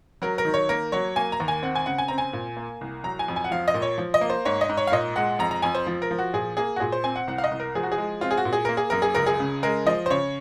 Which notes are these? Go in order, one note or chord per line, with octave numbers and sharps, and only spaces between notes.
F#3 A#4
A#4
D#3
C#5
A#3 A#4
F#3 C#5
A#3 G#5
A#5
D#2
G#5
C4 F#5
G#5
C#3 F#5
G#5
C4 A#5
G#5
A#2
A#3
C2
F#3 A#5
G#5
F2
G#5
F#5
F3 F5
D#5
A#2
C#5
F3
D#5
A#3
C5
G#2 C#5
D#5
G#2
C#5
F5
A#2 D#5
G#3 F#5
F2 A#5
A#5
F2 G#5
C5
F3
A#4
F3
F#4
A#2 G#4
A#3 G#4
F#4
A#2 G#4
C5
C4 G#5
F#5
C2 F#5
F5
D#5
C2
A#4
F3 G#4
F#4
G#4
G#3
C4 F4
G#4
F#4
A#2
G#4
A#3 A#4
G#4
F#2 A#4
G#4
C#2 A#4
G#4
C#3
G#3 A#4
F3 D#5
C5
C#3 C#5